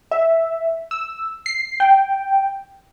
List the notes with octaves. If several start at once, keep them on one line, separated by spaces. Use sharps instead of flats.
E5
E6
C7
G5